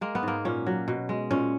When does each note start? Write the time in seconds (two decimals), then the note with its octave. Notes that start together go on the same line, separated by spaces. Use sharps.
0.01 G#3 A#3
0.15 B3
0.23 G#2 A#3
0.45 A#2 C#4
0.66 F#3
0.88 B2
1.09 G#3
1.31 A#2 C#4